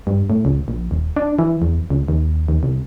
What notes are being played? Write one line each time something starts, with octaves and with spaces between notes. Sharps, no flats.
G2
A2
C#2
A#1
D#1
D4
E3
E2
C#2
D#2
D#2
C2